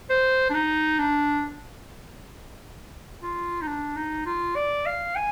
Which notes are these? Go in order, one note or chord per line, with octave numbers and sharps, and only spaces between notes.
C5
D4
D#4
D4
F4
D#4
D4
D#4
F4
D5
F5
G#5